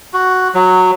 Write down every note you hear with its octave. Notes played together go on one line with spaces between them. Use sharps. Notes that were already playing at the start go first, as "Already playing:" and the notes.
F#4
F#3